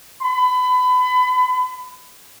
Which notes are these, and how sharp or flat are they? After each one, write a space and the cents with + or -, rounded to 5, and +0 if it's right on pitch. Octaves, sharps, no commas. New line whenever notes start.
B5 +30